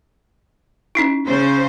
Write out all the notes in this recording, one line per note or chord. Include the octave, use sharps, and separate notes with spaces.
C#4 D#4 E4
C#3 C5